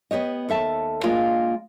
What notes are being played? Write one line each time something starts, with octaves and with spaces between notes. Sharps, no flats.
B3 G4 C#5 D#5
D#2 A4 E5 A5
G#3 A#3 D4 F4 F5